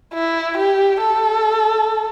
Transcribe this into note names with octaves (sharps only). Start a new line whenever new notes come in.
E4
G4
A4